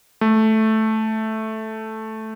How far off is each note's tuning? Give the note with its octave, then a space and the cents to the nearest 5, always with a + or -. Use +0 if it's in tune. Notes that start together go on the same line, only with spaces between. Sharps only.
A3 -5